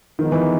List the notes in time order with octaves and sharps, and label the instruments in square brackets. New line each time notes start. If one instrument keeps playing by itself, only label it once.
[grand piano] D#3 [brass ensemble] F3 G#3 B3 D#4
[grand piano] E3